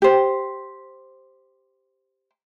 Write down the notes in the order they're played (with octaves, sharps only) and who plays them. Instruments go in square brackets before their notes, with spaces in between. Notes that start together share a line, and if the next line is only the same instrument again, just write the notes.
[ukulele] G4 C5